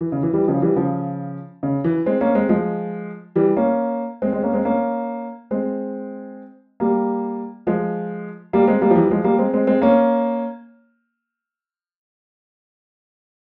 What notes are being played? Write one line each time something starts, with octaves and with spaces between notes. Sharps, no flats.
E3
C#3
E3
E3 G3
C#3 F3
E3 G3
C#3 F3
C#3
E3
G#3 C4
A#3 C#4
G#3 C4
F3 G#3
E3 G3
A#3 C#4
G#3 C4
G#3 C4
A#3 C#4
G#3 C4
A#3 C#4
G#3 C4
G3 A#3
F3 G#3
G3 A#3
G#3 C4
G3 A#3
F3
E3 G3
F3 G#3
G3 A#3
G#3 C4
G#3 C4
G#3 C4
A#3 C#4